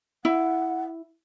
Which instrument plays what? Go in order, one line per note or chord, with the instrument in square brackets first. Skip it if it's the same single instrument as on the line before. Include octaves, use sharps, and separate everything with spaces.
[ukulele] E4 [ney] F#5